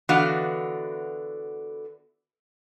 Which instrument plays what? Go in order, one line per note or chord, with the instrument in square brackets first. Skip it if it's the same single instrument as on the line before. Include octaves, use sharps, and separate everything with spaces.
[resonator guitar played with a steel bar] D3 E3 B3 F#4 D#5 F5